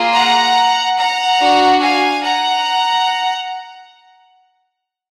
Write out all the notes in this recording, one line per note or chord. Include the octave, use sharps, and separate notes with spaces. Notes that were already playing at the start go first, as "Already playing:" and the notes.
Already playing: A#3 F4 G#4
F#5 A#5
F#5 A#5
D4 F#4
F5 G#5
F#5 A#5